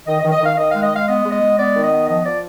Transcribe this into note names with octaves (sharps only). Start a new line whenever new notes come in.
D#3 D#5
D#5
D#3
D#5
D#3 F5
D#3 D#5
G#3 F5
D#5
G#3 F5
B3 D#5
G#3
D#5
G#3
B3 D5
D#3
D#5
B3
F3 D#5
F3 D5